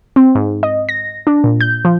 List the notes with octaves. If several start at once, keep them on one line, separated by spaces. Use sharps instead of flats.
C4
G#2
D#5
A#6
D4
A#2
G6
F3